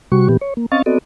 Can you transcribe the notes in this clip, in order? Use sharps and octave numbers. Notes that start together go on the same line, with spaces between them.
C3 G3 F#4 C#6
A#2 E3 B3 G4
C#5
A#3
C4 C#4 D#5 F5 C#6 A6
B3 C4 F#4 A4 D5 D#5